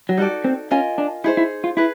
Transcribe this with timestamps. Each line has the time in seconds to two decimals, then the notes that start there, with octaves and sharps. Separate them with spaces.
0.09 F#3
0.17 G3 D#4 F#4 A4 D5
0.44 C4
0.71 C#4 F4 A#4 D#5 G#5
0.98 D4
1.24 D#4 E4 G#4 C5
1.37 E4
1.64 F4
1.77 E4 G#4 B4